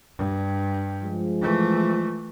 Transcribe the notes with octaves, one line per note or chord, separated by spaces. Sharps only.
G2
F3 G#3
E3 A3